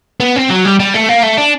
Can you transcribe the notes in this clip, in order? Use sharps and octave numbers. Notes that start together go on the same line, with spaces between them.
B3
C4
F#3
G3
G3
A3
A#3
A3
D4